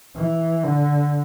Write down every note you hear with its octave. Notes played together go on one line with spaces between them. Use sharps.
E3
D3